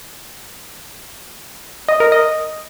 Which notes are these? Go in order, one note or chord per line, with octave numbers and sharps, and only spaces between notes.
D#5
A#4
D#5